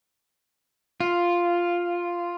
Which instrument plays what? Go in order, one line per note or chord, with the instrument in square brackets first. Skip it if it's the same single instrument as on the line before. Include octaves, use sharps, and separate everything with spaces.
[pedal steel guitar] F4